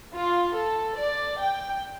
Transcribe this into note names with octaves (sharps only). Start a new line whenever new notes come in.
F4
A4
D5
G5